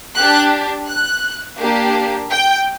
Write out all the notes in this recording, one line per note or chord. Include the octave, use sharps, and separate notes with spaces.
D4 G4 F#6
F#6
A#3 D4 G4
G5